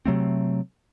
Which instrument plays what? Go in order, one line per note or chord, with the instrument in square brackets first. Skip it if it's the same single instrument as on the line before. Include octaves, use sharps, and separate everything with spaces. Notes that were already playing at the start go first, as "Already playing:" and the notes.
[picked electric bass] C3 F#3 A3 C4